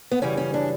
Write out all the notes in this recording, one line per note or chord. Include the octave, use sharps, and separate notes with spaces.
B3
F#2 C#3 E3 G3 C#4
C#4
D4